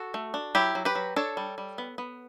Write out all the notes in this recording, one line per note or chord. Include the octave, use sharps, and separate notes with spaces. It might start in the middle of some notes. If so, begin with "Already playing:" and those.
Already playing: F#4 A4
A3
D4
F#3 E4 G4
F#3
G4 B4
F#3
D4 A4 C#5
G3
G3
B3
B3